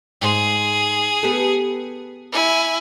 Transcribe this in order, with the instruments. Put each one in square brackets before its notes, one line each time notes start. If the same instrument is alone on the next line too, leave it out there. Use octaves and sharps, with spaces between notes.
[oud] G#2 C5 [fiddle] G#4
[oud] B3 G4 A4
[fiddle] E4 G#5